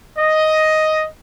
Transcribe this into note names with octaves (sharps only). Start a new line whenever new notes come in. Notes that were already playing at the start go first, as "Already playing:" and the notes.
D#5